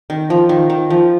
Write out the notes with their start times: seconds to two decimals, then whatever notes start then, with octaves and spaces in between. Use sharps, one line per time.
0.10 D#3
0.30 F3
0.49 D#3
0.70 D#3
0.90 F3